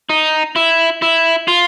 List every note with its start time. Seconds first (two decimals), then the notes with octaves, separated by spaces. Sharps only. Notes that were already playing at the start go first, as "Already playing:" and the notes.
0.10 D#4
0.56 E4
1.02 E4
1.48 F4